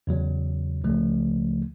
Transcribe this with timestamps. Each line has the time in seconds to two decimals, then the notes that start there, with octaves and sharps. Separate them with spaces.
0.07 E2 C#3 F#3
0.84 C#2 C#3 F3 A3